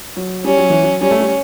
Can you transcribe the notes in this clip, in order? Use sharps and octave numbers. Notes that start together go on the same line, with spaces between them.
F#3
G3 C#4
F#3
E3
F#3
G3 C#4
A3
G3